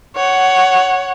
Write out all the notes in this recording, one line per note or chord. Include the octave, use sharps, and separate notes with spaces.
C#5 F#5